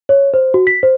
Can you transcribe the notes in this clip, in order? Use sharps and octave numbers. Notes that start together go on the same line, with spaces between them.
C#5
C5
F#4
B6
C5